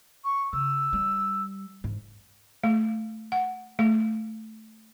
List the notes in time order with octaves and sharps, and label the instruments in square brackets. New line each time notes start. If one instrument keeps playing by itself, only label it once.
[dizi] C#6
[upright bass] C#3 [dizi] E6
[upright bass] G3
G#2
[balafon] A3
F#5
A3